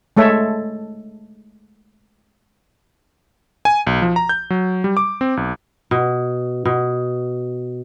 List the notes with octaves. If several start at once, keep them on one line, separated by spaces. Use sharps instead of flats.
G#3 A3 A4 C#5 E5
G#5
B1
F3
A#5
G6
F#3
G3
D6
C4
B1
B2
B2